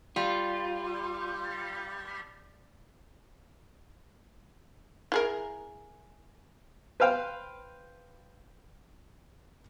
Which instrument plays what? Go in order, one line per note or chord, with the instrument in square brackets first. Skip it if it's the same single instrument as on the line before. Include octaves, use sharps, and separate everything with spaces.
[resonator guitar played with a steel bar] G3 [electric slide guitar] F4
[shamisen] E4 G#4 A#4
[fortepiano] B4 C5 F5 G5